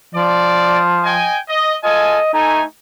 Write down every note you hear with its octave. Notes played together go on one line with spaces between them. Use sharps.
F3 D5
D#5 G5 G#5
D#5
F4 A4 D#5 G#5
A3 D#4 G#5